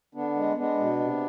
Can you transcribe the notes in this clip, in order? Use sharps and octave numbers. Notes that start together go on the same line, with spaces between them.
D3 B3 D4
G#3
G#3 B3 D4
B2
C3